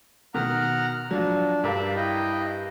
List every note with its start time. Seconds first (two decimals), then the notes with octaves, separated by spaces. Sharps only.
0.34 B2 D#3 F#5 A#5 F6
1.11 F3 F#3 D4
1.63 G2 A#4 D5 E5 F5
1.95 E4 D#5 G5